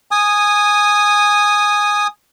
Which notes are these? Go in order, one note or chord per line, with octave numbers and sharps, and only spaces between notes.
G#5 D#6